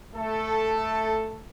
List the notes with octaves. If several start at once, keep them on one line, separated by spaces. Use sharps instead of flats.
A3 A4